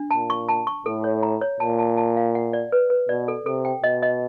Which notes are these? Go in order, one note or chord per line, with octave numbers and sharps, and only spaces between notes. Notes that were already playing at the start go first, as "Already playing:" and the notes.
Already playing: D4
A#2 A5
C#6
A5
C#6
A2 A4
C#5
A#5
C#5
A#2 A5
A5
A5
F5
F#5
D5
B4
B4
B2 D5
A4
C3 A4
G5
B2 D#5
D#5